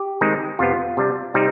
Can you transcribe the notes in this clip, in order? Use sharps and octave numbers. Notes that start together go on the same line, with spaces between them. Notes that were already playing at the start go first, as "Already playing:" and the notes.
Already playing: G4
D#3 G#3 C4 D#4
F2 C3 F3 B3 F4
C3 G3 D4
C3 G3 C4 D#4